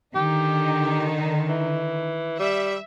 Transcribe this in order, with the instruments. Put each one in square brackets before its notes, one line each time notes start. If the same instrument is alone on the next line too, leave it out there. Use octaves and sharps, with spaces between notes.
[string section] D3 D#3 D#4 [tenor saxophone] G4
[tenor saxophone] E3
[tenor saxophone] G3 [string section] E5